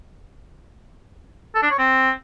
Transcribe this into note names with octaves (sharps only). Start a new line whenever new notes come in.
A4
D4
C#5
C4